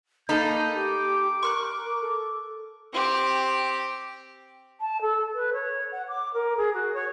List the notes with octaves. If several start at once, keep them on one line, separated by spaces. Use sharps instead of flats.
A#3 D#4 A4 F5 B5 G6
G4 D6
A#4 C#6 F6 F#6
A4
C4 G4
A5
A4
B4
C#5
F#5
D6
A#4
G#4
F#4
C#5